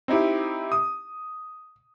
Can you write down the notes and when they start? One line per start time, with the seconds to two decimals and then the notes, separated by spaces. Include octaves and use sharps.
0.08 C4 D#4 E4 G4
0.72 D#6